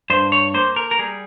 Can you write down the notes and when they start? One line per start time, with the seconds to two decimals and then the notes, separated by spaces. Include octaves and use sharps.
0.10 G2 C5
0.32 C#5
0.54 A#3 C5
0.76 A#4
0.91 A#4
0.99 G3 G#4